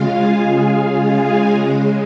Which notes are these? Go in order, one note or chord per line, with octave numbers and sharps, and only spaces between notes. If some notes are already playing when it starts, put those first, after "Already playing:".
Already playing: C#3 G#3 F4 F5
G#4 G#5
C#3 G#3